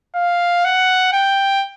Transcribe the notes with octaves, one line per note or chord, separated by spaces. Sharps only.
F5
F#5
G5